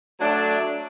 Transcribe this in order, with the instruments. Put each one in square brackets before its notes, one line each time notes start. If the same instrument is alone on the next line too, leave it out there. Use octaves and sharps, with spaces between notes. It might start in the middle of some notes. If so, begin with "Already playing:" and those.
[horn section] F#3 A3 D4